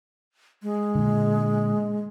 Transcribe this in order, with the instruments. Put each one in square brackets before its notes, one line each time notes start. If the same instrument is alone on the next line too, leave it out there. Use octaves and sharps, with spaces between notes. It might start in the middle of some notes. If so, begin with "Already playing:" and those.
[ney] G#3
[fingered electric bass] A#2 D3